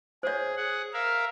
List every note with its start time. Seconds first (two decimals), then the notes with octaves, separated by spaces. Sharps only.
0.23 G#4 C5 C#5
0.57 G#4 F#5
0.93 A#4 E5 F5